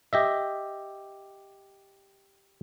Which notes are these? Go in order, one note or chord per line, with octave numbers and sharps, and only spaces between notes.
G4 D#5 E5